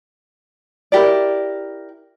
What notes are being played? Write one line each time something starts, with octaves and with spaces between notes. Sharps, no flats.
E4 G4 A#4 D5